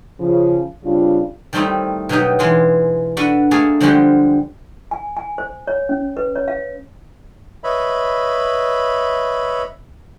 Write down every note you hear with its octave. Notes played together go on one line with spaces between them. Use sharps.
C#3 F3
C#3 G3 C4 D4 F4
D#3 G3 A3 C4 D#4 E4
B2 D#3 F#3 D#4 G4
E3 G#3 F4
D4 F#4 A4 B4
A3 A#3 G#4 A4
D3 F3 G3 G#3 F#4 G4
G#5
G#5
C5
C#5
C#4
B4
C#5
F5
B4 C#5 D#5 E5 B5